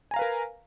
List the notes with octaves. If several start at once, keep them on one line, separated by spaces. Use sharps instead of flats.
A#4 B4 F5 G#5 A#5